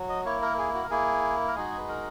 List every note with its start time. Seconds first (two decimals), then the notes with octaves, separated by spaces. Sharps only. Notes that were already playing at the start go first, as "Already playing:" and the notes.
Already playing: F#3
0.09 D#5
0.26 A#3 E4 C#5
0.42 A#4
0.58 G#4
0.74 F#4
0.83 A#4
0.90 A#3 E4 G#4
1.48 A#4
1.56 G#3 D#4 F#4 G#4
1.78 B4
1.89 A#4